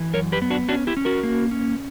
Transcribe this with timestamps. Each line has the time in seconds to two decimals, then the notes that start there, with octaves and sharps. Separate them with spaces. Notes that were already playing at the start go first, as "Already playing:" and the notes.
Already playing: E3
0.13 F#2 A#4 C#5
0.32 G4 B4
0.42 B3
0.50 D4 F#4
0.69 C#4 D4 F#4
0.87 E4 G4
0.97 C#4
1.05 F#4 A#4
1.23 A#3
1.51 C#4